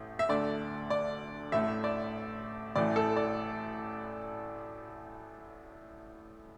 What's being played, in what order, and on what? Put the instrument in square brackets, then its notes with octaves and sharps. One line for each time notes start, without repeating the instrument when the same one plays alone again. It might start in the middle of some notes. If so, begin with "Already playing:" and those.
Already playing: [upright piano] A1 A2
E5
D2 D3 A3 D5
D5
A1 A2 A3 E5
D5
A1 A2 E3 A3 D5
A4
D5